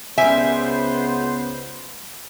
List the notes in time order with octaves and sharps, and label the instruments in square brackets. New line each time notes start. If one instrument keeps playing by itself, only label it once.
[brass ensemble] C#2 B3 C5 [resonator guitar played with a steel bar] G3 E5 G#5